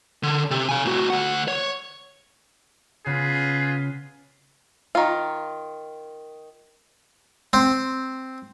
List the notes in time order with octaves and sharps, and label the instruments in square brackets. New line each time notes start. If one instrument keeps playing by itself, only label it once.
[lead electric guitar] D3
C3
F5 G#5
A2 F#4
D2 F#5
C#5
[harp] C#3 B3 [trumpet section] F4 G#4 B4
[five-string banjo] D#3 F4
[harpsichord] C4